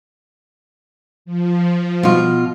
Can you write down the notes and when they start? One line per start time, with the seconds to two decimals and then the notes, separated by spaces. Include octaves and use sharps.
1.25 F3
2.03 B2 F4